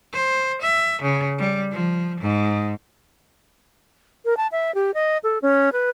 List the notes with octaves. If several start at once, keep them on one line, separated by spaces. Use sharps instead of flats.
C5
E5
C#3
G3
F3
G#2
A#4
A5
E5
G4
D#5
A4
C#4
B4